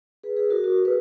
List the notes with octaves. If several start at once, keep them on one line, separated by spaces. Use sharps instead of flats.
G#4 B4
G#4 B4
F#4 A#4
F#4 A#4
G#4 B4